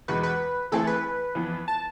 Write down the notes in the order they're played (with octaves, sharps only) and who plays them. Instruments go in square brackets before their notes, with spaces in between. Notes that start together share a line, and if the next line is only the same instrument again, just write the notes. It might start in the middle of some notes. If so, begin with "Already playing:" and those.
[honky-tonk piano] E2 B2 G#3 [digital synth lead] B4
[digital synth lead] B4
[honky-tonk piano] E3 A3 C4 E4 G#4 [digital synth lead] A4
[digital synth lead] B4
[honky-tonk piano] F2 E3 B3
[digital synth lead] A5